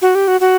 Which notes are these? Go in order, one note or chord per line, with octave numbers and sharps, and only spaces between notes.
F#4
G4
F#4
F#4